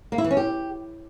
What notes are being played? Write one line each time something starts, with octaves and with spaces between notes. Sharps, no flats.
A#3
E4
E3
C#4
G4